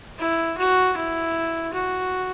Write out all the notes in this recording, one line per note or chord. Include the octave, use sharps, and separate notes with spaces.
E4
F#4
E4
F#4